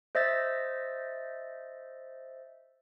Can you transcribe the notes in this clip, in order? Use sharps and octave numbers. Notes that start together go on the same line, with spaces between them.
C5 D#5 E5 E6 A6